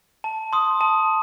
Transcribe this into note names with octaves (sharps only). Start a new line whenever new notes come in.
A5
C6 D#6
A5